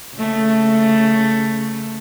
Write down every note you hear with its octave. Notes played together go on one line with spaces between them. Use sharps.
C#3 A3